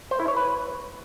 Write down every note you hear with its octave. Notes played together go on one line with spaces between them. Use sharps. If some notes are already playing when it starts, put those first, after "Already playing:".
C5
E4
C#5
B4